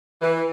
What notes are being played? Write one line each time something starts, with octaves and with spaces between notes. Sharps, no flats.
E3